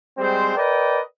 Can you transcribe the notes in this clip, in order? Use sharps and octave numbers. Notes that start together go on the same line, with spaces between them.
G3 G#3 C4 C5
A#4 B4 D5 D#5 G5